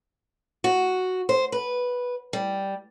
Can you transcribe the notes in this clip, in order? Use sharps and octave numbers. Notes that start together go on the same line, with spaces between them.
F#4
C5
B4
G3